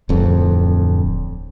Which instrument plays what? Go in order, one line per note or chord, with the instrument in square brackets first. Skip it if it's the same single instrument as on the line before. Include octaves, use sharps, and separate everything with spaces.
[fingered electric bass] D1 F2